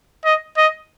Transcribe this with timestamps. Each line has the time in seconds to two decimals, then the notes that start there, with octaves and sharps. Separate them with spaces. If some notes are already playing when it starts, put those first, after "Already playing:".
0.25 D#5
0.57 D#5